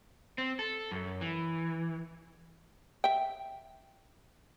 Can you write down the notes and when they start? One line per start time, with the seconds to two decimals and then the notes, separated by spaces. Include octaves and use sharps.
0.38 C4
0.59 A4
0.92 F#2
1.21 E3
3.04 E5 G5